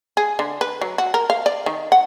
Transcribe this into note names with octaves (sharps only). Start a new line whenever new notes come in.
G#4
D3
B4
F#3
F#4
A#4
F5
D5
D#3
F#5